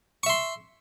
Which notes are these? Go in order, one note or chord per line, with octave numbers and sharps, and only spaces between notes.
E5 C6 C#6